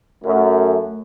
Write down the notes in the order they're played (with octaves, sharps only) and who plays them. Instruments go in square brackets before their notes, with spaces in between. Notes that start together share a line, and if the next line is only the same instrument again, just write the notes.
[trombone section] F#2 [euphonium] A3